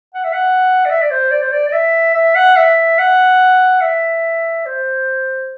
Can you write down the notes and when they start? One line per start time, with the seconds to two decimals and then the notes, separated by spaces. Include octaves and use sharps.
0.14 F#5
0.24 E5
0.33 F#5
0.85 D5
0.90 E5
1.02 D5
1.11 C5
1.31 D5
1.42 C5
1.52 D5
1.69 D5
1.73 E5
2.15 E5
2.36 F#5
2.56 E5
2.99 F#5
3.81 E5
4.66 C5